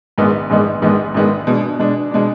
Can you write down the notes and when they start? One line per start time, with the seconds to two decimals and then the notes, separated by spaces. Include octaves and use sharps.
0.18 A#1 G#2 D#3 G#3 B3
0.50 A#1 G#2 D#3 G#3 B3
0.82 A#1 G#2 D#3 G#3 B3
1.14 A#1 G#2 D#3 G#3 B3
1.47 B2 G#3 D4
1.79 B2 G#3 D4
2.11 B2 G#3 D4